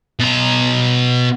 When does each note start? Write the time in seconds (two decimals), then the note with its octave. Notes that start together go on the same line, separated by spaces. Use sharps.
0.19 B2 A#5